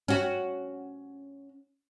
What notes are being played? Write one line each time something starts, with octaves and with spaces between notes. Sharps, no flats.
C#4 F#4